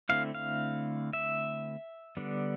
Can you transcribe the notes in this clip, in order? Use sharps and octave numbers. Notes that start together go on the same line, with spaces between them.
D3 A3 C4 E4 F5
F5
E5
D3 G3 B3 D4